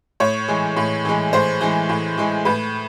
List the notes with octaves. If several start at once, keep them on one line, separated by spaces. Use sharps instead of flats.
A2 C#5
E3 G#3
A2
E3 G#3
A2 C5
E3 G#3
A2
E3 G#3
A2 B4